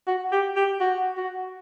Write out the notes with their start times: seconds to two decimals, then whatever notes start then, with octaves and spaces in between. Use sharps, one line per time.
0.07 F#4
0.32 G4
0.56 G4
0.80 F#4
1.17 F#4